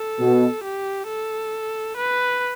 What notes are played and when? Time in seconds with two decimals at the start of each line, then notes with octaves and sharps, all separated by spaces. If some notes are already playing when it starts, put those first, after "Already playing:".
Already playing: A4
0.19 B2
0.64 G4
1.08 A4
1.97 B4